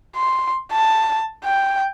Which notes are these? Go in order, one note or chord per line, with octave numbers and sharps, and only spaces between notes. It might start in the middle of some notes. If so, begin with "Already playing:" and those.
C6
A5
G5